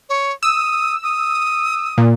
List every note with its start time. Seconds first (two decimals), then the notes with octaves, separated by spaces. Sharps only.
0.09 C#5
0.43 D#6 E6
1.03 D#6
1.98 A#2